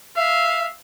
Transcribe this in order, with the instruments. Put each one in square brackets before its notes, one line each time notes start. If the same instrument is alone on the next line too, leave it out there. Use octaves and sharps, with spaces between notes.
[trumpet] E5 [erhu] F5